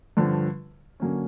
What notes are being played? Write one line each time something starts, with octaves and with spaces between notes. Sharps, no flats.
G2 D3 F3
D3 F#3 A#3 C#4